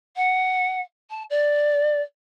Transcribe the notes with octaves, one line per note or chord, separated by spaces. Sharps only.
F#5
A5
D5